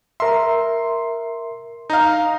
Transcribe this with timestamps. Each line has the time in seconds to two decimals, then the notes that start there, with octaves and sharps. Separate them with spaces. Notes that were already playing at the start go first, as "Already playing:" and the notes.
0.20 A#4 E5 C6
1.90 D#4 F5 A#5 F6